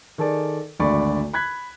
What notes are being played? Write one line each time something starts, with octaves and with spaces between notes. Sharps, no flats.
D#3 G#4 A4 D5
G#1 D2 D3 D5 B5 C#6
B5 F#6 G#6 B6